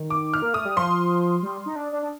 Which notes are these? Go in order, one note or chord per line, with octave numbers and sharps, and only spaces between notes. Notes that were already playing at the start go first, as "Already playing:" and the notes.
Already playing: D#3
D6
F6
A#3
A3 D#6
G3
F3 C6
G3
D#4
D4
D4
D4